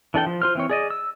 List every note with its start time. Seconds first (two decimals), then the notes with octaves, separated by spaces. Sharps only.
0.14 E3 D4 A4 G5
0.26 F3
0.42 F4 C5 F6
0.55 E3 C4 C#5
0.69 G#4 D5 D#5
0.90 E6